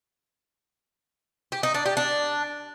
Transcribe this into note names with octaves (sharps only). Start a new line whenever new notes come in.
G4
D#4
D4
G4
D4